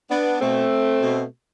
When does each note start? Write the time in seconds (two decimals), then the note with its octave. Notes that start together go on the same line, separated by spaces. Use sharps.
0.10 B3 D4
0.41 B2 A3 C4
1.02 B2